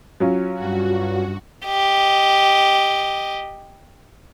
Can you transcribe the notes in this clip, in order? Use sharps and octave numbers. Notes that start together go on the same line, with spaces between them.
F#3 C#4 F4
G2 F#4
G4 D#5